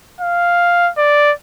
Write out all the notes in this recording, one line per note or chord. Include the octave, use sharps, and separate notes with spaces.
F5
D5